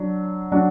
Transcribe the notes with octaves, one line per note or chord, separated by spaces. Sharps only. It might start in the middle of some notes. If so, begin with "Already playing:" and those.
Already playing: F#3 D4
F#3 D4 F#4